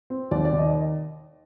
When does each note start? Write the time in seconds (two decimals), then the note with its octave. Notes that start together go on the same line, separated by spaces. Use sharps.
0.10 C4
0.31 D#2 D5
0.45 D5
0.53 D#3
0.59 D#5